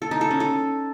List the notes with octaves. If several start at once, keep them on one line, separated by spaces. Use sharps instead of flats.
A4
D#4
A4
C#4
A4